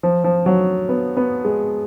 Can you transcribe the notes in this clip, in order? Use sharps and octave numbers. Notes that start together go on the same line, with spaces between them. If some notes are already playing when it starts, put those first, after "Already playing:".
F3
F3
F#3
B3
B3
G#3